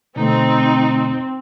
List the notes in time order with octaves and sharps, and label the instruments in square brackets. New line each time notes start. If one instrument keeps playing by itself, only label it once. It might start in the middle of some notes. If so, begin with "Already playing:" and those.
[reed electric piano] B2 D3 A3 [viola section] C4 [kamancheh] D#4